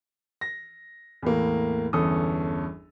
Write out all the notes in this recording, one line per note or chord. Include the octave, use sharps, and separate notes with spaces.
A#6
E2 A2 A#3
G1 E2 C#4 A4 D#6